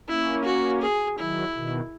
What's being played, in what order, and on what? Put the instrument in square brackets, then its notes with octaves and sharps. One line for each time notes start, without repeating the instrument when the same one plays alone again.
[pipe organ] A#3 C#4 [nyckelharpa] E4
[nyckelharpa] F#4
G#4
[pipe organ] D#3 F#3 [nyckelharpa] E4
[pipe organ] B2 D#3